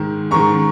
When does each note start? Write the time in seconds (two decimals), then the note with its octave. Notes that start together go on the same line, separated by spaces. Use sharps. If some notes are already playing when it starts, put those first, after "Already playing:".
Already playing: G#2 D#3
0.31 G#2 D#3 A#5 C#6